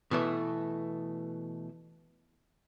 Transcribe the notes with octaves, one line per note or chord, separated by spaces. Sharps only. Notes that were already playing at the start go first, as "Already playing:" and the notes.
B2 E3 A3